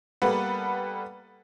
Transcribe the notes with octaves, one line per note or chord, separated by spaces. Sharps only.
G3 A#3 B3 A4 B4 F#5